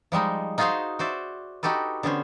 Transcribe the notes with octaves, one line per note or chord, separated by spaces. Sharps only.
F3 G3 G#3 D#4
D#4 F4 F#4 G#4 C5 F5
F#4 C5 D5 E5
D#4 F#4 G4 A4 B4
D3 B3 C#4 C5